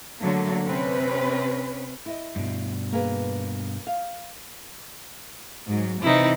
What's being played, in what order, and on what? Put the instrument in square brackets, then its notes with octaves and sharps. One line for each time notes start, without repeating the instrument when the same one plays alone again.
[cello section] D3 F#3 A3 A#3
C3 C4 C#4 B4
[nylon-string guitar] E4 D#5
[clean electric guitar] G2 B2
[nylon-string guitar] A#3 G#4 B4
F5
[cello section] G#2 F#3
[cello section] C3 E3 C4 [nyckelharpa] D#4 E4